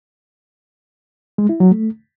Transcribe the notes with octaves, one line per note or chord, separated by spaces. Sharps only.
G#3
E4
F#3
A3